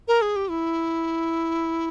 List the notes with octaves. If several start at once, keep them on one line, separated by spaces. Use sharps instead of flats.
A#4
G#4
G4
E4